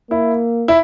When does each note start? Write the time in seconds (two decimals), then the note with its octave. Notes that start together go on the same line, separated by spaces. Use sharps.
0.11 A#3 E4
0.68 E4